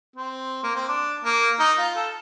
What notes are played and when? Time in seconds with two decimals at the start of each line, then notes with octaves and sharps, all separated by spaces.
0.16 C4
0.63 A#3
0.76 C4
0.88 D4
1.25 A#3
1.60 D#4
1.78 F4
1.96 A4